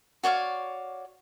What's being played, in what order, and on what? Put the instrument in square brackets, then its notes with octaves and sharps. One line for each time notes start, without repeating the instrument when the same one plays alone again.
[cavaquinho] F#4 C#5 D5 F5